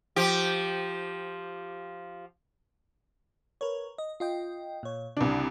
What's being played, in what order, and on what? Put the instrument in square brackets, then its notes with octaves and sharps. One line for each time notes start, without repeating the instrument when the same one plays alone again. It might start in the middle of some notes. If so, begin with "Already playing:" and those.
[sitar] F3 G4
[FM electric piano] A#4 B4 C#5
D#5
F4 D#5 G5
A#2 C#5
[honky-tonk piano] C2 D4 [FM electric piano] C#3